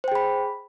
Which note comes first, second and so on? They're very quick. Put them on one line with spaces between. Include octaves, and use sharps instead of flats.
C5 G5 G#4 B5